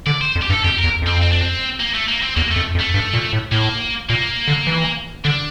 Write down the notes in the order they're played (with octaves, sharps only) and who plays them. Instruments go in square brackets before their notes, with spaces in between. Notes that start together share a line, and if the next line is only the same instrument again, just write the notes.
[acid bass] D3 [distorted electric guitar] D5
[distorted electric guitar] C5
[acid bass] F2
[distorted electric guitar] G4
[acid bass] G2 [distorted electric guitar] A4
[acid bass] F2 [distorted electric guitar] G4
[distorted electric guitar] A#4
[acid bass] E2
[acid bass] F2 [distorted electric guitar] C4
[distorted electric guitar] C4
D4
C4
A#3
A3
A#3
C4
[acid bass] E2 [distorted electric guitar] A#3
[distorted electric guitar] A3
[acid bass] F2
F2
[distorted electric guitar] A3
[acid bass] G2
A#2
A2
[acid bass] A2 [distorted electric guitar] A#3
[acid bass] A#2 [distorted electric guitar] A#3
[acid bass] D3
E3
[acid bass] D3 [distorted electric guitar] D4